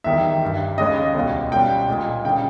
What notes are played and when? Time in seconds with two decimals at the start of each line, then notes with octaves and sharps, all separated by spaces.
0.04 E2 D#3 G3 E5
0.42 G2 G3
0.78 D#2 C#3 G#3 D#5
1.14 C#2 B2 G3
1.51 C#2 B2 G3 G5
1.89 A#2 G#3
2.25 C#3 G3 G5